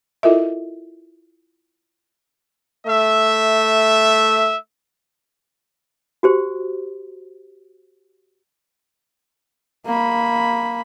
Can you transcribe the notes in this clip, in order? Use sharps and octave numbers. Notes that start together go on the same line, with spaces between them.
E4 F4 A4 A#4 D#5 E5
A3 E5
F#4 G4 C5
A#3 B5